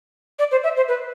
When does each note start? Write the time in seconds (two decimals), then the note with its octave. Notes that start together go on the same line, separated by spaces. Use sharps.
0.39 D5
0.51 C5
0.64 E5
0.77 C5
0.88 B4